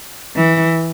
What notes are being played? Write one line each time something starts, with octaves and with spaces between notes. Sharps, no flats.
E3